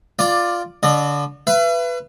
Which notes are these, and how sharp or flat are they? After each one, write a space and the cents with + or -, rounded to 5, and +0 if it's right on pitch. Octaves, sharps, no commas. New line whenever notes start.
F4 +0 D5 +10 D6 +0
D3 -25 D#5 -45
B4 +5 E5 +45